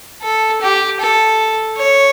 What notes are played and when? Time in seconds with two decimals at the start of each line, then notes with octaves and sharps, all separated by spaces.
0.23 A4
0.62 G4
1.00 A4
1.78 C#5